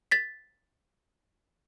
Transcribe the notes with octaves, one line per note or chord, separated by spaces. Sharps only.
A6 B6